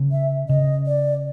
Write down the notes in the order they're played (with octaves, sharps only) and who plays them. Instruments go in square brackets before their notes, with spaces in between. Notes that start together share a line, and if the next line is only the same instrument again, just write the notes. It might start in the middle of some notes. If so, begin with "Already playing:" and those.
Already playing: [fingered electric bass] C#3
[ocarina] E5
[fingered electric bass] C#3 [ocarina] D#5
[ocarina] D5